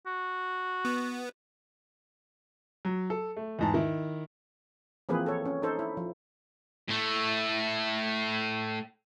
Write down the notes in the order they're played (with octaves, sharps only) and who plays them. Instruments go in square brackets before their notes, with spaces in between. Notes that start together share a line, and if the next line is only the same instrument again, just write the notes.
[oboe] F#4
[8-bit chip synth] B3
[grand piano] F#3
A4
A3
E2 G#2 A5
D#3 E4
[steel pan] E3 F3 A#3 C4 G#4 B4
A4 C#5
C#4
D#4 A4 C5
E4
F3
[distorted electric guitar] A2 A3